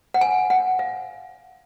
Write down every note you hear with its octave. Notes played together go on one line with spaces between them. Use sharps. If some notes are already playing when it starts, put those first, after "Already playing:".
F#5
G#5
F#5
F5